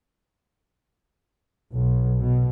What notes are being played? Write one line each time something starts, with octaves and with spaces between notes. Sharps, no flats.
B1
B2